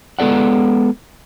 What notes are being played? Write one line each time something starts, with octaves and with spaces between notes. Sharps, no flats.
G#3 B3 A4 D5 F#5